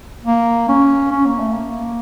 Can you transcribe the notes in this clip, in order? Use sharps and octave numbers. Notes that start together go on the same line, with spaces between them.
A#3
C#4
C#4
A#3
A3
A#3